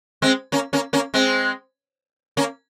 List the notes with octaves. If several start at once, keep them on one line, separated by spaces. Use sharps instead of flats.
G#3 C4
A#3 C#4
A#3 C#4
A#3 C#4
G#3 C4
A#3 C#4